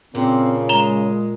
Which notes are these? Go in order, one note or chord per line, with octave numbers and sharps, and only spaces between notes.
A#2 C#3 C4
G#3 A#5 E7 G7